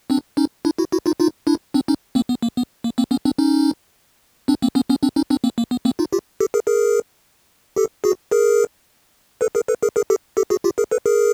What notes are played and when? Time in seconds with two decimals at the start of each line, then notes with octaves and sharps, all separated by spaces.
0.10 C4 D4
0.37 C#4 D#4
0.65 D4 E4
0.78 E4 F#4
0.92 E4 F#4
1.06 D#4 F4
1.20 D#4 F4
1.47 D4 E4
1.74 C4 D4
1.88 C#4 D#4
2.15 A#3 C4
2.29 B3
2.42 A#3
2.57 B3
2.84 A#3
2.98 A#3 C4
3.11 B3 C#4
3.25 C4 D4
3.38 C#4 D#4
4.48 C4 D4
4.62 A#3 C4
4.75 B3 C#4
4.89 B3 C#4
5.03 C4 D4
5.16 C#4 D#4
5.30 C4 D4
5.44 A#3 C4
5.58 A#3
5.71 B3
5.85 A#3 C4
5.99 D#4 F4
6.13 F4 G4
6.40 G4 A4
6.54 G#4 A#4
6.67 G#4 A#4
7.76 G4 A4
8.04 F#4 G#4
8.31 G#4 A#4
9.41 A4 B4
9.55 G#4 A#4
9.68 A4 B4
9.83 G#4 A#4
9.96 G#4 A#4
10.10 G4 A4
10.37 G4 A4
10.50 F#4 G#4
10.64 F4 G4
10.78 G#4 A#4
10.91 A4 B4
11.06 G#4 A#4